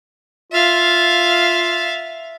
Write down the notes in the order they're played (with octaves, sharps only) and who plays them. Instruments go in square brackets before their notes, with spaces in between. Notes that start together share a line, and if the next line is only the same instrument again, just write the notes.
[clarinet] F4 [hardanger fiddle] E5 F5